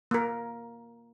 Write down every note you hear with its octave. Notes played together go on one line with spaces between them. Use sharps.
A#3 A#4